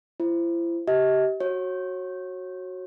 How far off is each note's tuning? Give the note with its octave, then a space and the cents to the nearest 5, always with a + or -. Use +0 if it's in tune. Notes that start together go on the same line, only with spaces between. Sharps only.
E4 +40 C5 +0
G4 -20 D#5 +40
F#4 +0 C#5 -25